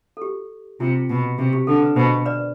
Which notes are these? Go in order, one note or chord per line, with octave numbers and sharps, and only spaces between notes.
A4
G4
C3 F4
B2
C3 G4
G4
D3 A4
B4
B2 C5
B4 D5